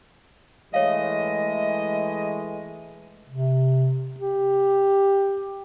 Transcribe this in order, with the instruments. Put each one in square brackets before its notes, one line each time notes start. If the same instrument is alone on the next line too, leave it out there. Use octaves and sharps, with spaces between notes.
[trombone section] E3 G#3 A3 [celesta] C#5 F5 [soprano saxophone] D#5
[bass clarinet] C3
G4